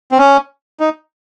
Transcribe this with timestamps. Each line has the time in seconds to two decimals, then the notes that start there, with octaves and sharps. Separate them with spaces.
0.12 C4
0.18 C#4
0.80 D#4